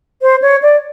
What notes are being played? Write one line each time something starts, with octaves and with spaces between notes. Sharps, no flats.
C5
C#5
D5